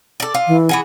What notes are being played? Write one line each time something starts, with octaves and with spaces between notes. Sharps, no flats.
A4 D5
F4
E3
E3 F#4 G#4